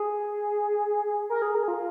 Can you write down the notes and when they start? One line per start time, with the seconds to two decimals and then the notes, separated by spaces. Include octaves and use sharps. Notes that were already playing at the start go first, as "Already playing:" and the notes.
Already playing: G#4
1.30 A#4
1.42 G#4
1.55 A#4
1.63 G#4
1.68 F4